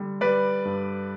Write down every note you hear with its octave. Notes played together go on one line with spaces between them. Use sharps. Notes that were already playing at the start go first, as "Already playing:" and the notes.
Already playing: D3 G3
G3 B4 D5
G2